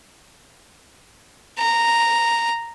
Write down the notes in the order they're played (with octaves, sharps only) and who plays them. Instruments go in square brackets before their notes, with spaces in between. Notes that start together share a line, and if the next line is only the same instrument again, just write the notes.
[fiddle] A#5